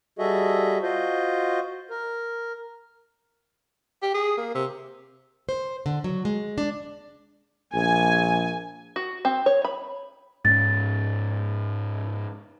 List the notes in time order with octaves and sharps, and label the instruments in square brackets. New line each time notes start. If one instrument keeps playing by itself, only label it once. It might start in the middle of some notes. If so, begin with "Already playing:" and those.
[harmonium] G3 F#4 G#4 A4 D#5 E5
F4 F#4 C5 D#5
A#4
[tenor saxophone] G4
G#4
A#3
C3
[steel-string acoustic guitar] C5
D3
F#3
G#3
D4
[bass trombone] A#1 [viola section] G#5
[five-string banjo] F#4
C4
C#5
B5
[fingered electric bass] G#2 C4 C#4 [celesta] A6